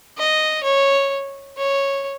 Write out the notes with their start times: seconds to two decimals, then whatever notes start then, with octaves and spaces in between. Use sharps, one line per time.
0.18 D#5
0.63 C#5
1.57 C#5